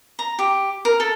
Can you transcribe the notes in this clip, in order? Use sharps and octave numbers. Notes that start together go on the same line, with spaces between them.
A#5
G4
A#4
A4